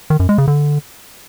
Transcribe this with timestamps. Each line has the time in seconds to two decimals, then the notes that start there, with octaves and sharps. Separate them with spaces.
0.10 D#3
0.20 F#2
0.29 G#3
0.38 C#3
0.48 D3